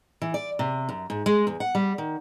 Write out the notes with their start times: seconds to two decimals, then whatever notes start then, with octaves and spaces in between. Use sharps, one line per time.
0.22 E3
0.34 D5
0.59 C3
0.89 F#2
1.10 G#2
1.26 G#3
1.47 E2
1.60 F#5
1.75 G3
1.98 D#3